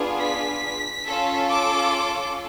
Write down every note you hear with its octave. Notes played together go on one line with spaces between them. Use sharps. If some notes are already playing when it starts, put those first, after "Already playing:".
Already playing: B3 D4 F4 G#4
B6
C#4 F4 A4
D6